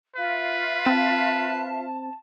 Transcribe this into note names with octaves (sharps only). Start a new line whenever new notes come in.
F4 B4 E5 F5
C4 A5